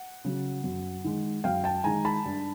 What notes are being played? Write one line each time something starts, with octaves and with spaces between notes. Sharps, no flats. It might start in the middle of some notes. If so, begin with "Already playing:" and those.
Already playing: F#5
C#3 F#3
F#2
D#3 G#3
F#2 F5 G5
G5 A5
D#3 G#3 G#5 A#5
A5 B5
G2